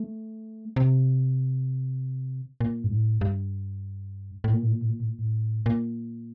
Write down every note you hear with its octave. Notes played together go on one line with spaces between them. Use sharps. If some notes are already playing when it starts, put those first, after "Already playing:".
Already playing: A3
C3
A#2
G2
A2
G2
A2
A#2
A2
A#2
A2
A#2
A2
A#2
A2
A#2